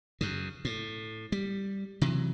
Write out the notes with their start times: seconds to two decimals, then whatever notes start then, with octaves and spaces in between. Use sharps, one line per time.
0.21 F#2 C#3
0.65 A2
1.32 G3
2.01 C3 E3 F#3